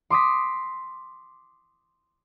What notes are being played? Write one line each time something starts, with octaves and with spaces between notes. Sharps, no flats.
C6 D6 D#6 B6